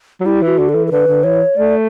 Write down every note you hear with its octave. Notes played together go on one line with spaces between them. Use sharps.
F#3
G3 E4
E3
F#4
D3
A4
E3
A4
D3 B4
D3
E3 C#5
A3 D5